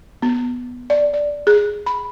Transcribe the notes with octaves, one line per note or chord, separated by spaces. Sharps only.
B3
D5
D5
G#4
B5